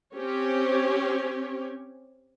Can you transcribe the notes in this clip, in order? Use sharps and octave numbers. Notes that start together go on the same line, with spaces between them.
C4 C#4 G4 C#5